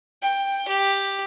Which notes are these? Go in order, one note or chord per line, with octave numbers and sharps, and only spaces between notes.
G5
G4